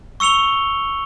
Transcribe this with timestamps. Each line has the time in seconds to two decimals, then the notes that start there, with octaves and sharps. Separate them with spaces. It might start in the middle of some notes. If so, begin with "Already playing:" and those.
0.20 C#6 E6 C#7 F7 G7